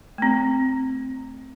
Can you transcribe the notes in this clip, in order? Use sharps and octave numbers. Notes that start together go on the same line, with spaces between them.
A3 C4